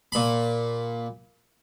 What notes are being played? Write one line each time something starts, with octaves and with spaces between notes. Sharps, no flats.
A#2 B5